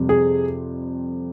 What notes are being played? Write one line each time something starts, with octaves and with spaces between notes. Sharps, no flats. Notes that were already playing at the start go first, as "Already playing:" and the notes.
Already playing: F2 C3 G3
G#4